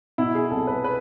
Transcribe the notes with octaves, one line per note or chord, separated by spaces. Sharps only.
B2 E4
G#4
C2 A4
B4
B4